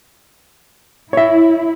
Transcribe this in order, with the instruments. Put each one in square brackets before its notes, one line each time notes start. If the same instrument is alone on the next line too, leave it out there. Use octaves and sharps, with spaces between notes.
[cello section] E4 [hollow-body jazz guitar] C#5 E5